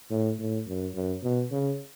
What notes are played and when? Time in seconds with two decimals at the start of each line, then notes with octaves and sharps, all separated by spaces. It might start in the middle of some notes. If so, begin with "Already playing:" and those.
0.11 A2
0.39 A2
0.67 F#2
0.95 F#2
1.23 B2
1.51 C#3